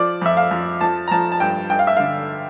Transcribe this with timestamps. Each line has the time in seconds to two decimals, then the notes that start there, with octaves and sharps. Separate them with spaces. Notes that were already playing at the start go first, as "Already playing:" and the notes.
Already playing: F3 D5
0.22 F2 E5
0.37 F5
0.51 F2
0.81 F3 A5
1.08 A#5
1.11 F3 A5
1.32 A5
1.40 G2 G5
1.70 G2 G5
1.79 F5
1.87 E5
1.97 D3 F5